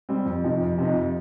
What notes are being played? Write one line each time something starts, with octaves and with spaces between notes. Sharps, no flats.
G3 C4
F2
C3 F3 D#4
F2
C3 F3 D#4
F2